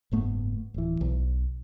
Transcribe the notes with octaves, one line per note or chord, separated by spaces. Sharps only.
F#1 G#2 A3 B3
D1 E3
B1